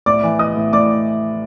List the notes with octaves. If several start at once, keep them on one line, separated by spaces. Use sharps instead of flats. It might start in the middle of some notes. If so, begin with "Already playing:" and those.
A2 D5 D6
E3
E3 D#5 D#6
A2
A2 D5 D6